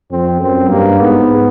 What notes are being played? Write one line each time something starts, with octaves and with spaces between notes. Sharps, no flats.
F2 C4
F#2 C4
G2 A#3
G#2 B3